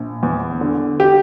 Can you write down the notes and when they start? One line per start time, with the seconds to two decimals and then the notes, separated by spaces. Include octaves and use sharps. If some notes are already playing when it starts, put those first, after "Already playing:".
Already playing: A#1
0.23 E2
0.61 D3
1.00 G4